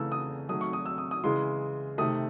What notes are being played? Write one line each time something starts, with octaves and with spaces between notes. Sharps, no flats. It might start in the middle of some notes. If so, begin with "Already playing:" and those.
Already playing: C#3 E3 A3 E6
D#6
D#3 F#3 A3 D#6
C#6
D#6
E6
D#6
D#6
C#3 E3 G#3 C6
C3 D#3 A3 D#6